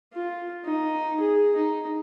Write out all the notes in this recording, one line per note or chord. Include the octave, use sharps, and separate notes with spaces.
F4
D#4
G#4
D#4